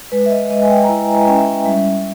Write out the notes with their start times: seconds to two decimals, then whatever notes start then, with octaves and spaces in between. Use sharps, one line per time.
0.12 G#3 B4
0.26 E5
0.31 D#5
0.50 G#3 D#5
0.62 G#5
0.70 G5
0.84 A#5
0.88 E4 G#5
1.27 C#4 G5
1.37 E5
1.46 G5
1.65 G3 E5